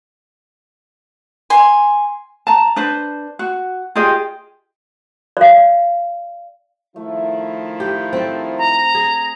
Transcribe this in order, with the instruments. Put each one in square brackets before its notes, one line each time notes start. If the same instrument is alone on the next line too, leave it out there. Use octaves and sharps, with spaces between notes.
[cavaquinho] G#5 C6
[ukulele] A5 A#5
D4 B4 C5
F#4
F4 G4 G#4 D#5
[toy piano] D5 F5
[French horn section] D#3 F3 E4 [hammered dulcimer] A3
[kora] G4
C4 A4
[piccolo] A#5
[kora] G#4